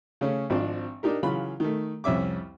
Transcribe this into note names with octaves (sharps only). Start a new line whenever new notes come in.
C#3 A3 C#4
G#1 F3 C4 D4
D4 D#4 G4 A#4
C#3 E3 F#3 F4 B5
D#3 A3
C2 F2 C#4 E5 D6